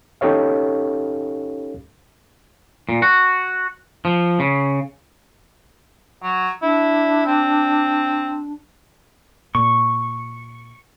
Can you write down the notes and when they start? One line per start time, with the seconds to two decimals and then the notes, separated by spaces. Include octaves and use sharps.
0.21 C#4 D#4 G4 A4 C#5 F5
2.89 A#2
3.02 F#4
4.05 F3
4.40 C#3
6.23 F#3
6.62 D4 E4
7.26 C4
9.55 A#2 C#6